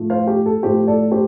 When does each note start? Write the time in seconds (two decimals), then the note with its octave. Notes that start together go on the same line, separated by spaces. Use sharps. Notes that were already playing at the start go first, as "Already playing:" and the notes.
Already playing: A2 F3 A3
0.10 C5 F5
0.27 G4
0.46 A4
0.63 A2 F3 A3 G4 C5
0.87 A4 D5
1.12 G4 C5